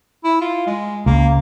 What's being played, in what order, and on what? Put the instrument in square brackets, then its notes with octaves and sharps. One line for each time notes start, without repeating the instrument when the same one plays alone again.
[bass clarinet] E4
F4
G#3
[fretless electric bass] C#2 [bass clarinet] A#3